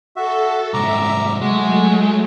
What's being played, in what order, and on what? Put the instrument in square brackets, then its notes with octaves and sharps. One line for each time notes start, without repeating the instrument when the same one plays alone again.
[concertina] F#4 E5 [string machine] A4
[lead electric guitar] C2 G#2 [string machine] E5 [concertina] A#5 D6
[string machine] F#3 A3 [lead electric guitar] G#3 [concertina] F#4